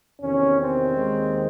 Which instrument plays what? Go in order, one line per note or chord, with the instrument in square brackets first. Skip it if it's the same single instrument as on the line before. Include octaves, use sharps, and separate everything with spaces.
[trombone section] E2 C3 D#3 C#4
C4
D#2 D#3 G#3